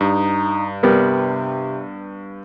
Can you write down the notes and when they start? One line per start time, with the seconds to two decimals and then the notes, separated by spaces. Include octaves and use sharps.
0.01 G2 D#4
0.83 C3 G3 B3 A#4